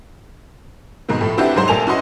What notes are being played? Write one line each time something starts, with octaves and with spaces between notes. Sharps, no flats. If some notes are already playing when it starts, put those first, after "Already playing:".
G#2 B2 D#3 C4
A2 F3 A3
C4 D4 E4 F#4 G4 B4
F1 G#2 F#3 C5 C6
A#1 A3 A#3 G#5 A5 F7
C#4 E4 F#4 B4 D#5 C6